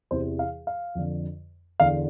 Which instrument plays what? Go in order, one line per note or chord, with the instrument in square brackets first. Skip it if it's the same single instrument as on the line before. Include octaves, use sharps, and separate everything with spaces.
[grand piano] E2 C3 E3 C5
F5
F5
F2 D3
E2 D3 F5